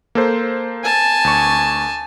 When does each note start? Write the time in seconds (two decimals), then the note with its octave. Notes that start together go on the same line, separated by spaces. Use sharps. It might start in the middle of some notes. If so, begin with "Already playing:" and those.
0.15 A#3 A4 C5
0.84 G#5 A5
1.24 D2 C#6